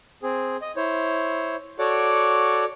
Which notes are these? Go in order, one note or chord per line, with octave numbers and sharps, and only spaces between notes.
C4 G#4
D#5
E4 C5 C#5
F#4 A4 C#5 D5 F#5 D6